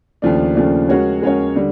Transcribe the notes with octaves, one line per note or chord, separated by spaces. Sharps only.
D#2 C#3 F3 A3 D4
D#2 C#3 F3 A3 D4
G#3 C#4 F#4 A#4 C#5
G#3 C#4 F#4 A#4 C#5
D3 G3